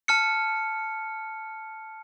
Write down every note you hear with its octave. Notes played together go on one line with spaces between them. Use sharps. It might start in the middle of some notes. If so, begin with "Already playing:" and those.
A5 F6 C#7